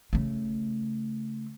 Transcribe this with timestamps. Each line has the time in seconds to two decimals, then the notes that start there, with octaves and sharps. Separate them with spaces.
0.13 C#3 A3